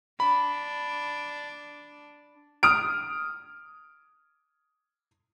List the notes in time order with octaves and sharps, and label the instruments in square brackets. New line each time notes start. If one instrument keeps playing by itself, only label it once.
[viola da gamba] D4 [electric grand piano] B5
[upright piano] D#6 F6 D7